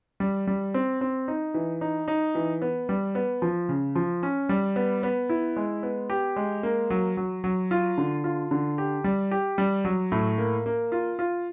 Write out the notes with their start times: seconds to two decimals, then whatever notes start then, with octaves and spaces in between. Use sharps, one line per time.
0.20 G3
0.47 G3
0.74 C4
1.01 C4
1.28 D#4
1.54 E3
1.81 D#4
2.08 D#4
2.35 E3
2.62 B3
2.89 G3
3.15 B3
3.42 F3
3.69 C#3
3.96 F3
4.23 C#4
4.49 G3
4.76 B3
5.03 B3
5.29 E4
5.57 G#3
5.83 B3
6.10 G4
6.36 G#3
6.63 A#3
6.90 F#3
7.17 F#3
7.44 F#3
7.71 F4
7.98 D3
8.24 F4
8.51 D3
8.78 G4
9.04 G3
9.31 G4
9.58 G3
9.85 F#3
10.12 A2
10.38 A#3
10.66 A#3
10.92 F4
11.19 F4